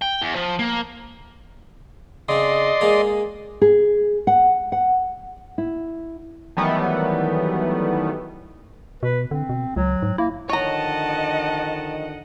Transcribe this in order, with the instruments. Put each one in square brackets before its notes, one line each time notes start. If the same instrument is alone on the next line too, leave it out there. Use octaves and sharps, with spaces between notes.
[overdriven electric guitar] G5
E2
F3
A#3
[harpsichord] C#3 C4 [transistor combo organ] D5 D#5 C6
[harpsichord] G#3 A#3 G#4
[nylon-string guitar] G#4
F#5
F#5
E4
[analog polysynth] D#3 E3 F#3 G3 A3 B3
[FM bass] B2 [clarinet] B4
[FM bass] D3 [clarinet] C4
[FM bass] B2
[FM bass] C#2 [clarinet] F#3
[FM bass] G#2
[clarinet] A#3 [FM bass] E4
[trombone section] D3 D#3 F3 [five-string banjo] C#5 A#5 [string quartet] D#5 F#5 [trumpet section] A5